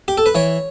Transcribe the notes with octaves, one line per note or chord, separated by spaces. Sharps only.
G4
A4
B4
E3 C#5